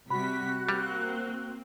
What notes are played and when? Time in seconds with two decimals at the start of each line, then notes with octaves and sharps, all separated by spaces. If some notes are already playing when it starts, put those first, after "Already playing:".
0.11 C3 G3 F#4 B5 F#6 B6
0.69 G3 A#3 C4